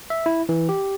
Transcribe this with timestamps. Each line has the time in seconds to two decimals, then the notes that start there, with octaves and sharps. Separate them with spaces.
0.10 E5
0.26 E4
0.49 E3
0.69 G4